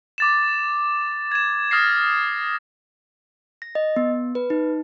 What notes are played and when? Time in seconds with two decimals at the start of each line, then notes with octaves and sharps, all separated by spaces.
0.18 D6 A6 E7
1.31 G#6 E7
1.71 D#6 F6 A6 A#6 C7
3.62 A#6
3.75 D#5
3.96 B3
4.35 B4
4.50 D#4